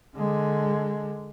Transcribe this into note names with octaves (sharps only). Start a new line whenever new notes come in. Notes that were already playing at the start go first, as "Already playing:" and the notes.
D3 G#3